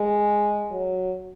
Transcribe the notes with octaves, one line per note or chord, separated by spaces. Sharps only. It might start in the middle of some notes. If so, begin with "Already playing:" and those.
Already playing: G#3
F#3